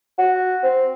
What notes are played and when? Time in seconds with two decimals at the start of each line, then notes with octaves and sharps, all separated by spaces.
0.18 F#4
0.63 C4